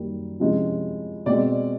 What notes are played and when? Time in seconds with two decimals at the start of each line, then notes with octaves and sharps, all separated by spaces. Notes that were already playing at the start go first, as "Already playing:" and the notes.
Already playing: F#2 D#3 G3 A#3
0.40 C3 F3 G#3 C#4 E4
1.26 B2 G#3 C4 D5